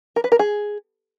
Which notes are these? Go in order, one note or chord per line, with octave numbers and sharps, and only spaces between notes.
A#4
B4
A#4
G#4